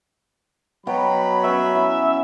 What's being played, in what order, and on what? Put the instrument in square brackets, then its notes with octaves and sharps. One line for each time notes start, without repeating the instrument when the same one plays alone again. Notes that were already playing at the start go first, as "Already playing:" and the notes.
[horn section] F#3 B5 [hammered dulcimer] B3 D#5 G5
[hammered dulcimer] B3 C#4 [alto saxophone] E5
[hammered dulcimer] E4